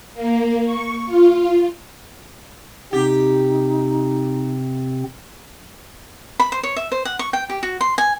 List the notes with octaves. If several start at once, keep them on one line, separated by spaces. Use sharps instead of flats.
A#3
C#6
F4
C3 C4 D#4 G4
B5
C5
C#5
E5
C5
F#5
C#6
G5
G4
F#4
C6
G#5